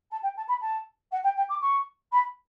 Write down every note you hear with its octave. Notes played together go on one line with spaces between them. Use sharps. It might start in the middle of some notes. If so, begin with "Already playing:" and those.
A5
G5
A5
B5
A5
F#5
G5
G5
D6
C#6
B5